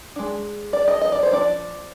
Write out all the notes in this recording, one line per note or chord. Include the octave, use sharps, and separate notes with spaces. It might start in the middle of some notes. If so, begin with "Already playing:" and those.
G#3 D4
D5
D#5
D#5
D5
C5
F3 A#3 D4 D5